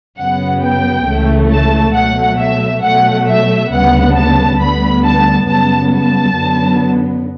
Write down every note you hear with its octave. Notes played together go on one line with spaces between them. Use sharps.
F#2 C#3 F#3 B3 F#5
G5
C#2 C#3 E3 A3
A5
B2 F#3 A3 F#5
E5
B2 F#3 A3 F#5
E5
D2 C#3 G3 B3 F#5
A5
D2 D3 G3 B3 B5
A5
F#2 C#3 G3 B3 A5
A5
F#2 D3 F#3 B3